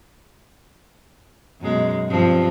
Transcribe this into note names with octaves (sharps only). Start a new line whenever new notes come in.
F#2 B2 G#3
G2 F3 C4